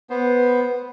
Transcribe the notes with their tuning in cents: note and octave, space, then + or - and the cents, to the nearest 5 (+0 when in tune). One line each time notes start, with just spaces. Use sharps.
B3 +0 C5 +5